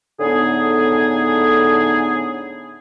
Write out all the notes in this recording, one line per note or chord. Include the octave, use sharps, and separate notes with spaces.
A2 D3 B3 D#4 G#4